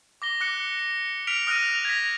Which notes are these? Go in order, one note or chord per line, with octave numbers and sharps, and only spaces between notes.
D6 A#6 G7
D6 F#6 C#7
C#7
F6 B6 D7 F7
D#6 F6 F#6 A#6 D#7
G#6 A#6 B6